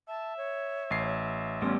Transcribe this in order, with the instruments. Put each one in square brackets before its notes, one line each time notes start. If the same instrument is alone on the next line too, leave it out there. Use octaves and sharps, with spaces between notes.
[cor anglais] E5 [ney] A5
[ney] C#5
[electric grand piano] A1 C7
[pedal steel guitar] G3 A3 B3 [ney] C#4 [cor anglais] F4